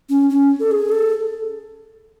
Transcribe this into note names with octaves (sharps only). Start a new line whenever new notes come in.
C#4
C#4
A4
G#4
A4